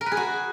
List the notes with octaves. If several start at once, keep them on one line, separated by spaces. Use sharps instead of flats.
A#4
B4
G#4
F#4